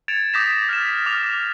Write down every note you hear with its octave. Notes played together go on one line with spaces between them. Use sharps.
G#6 A6 C#7 D7 E7 F7
D6 D#6 G6 A#6 B6 E7
F6 A6 B6 E7
D6 F6 F7